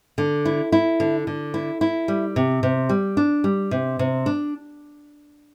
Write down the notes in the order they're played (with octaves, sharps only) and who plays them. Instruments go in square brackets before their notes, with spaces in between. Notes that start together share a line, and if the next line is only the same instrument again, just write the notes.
[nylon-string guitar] D3
E4
E4
D3
D3
E4
E4
G3
C3
C3
G3
D4
G3
C3
C3
D4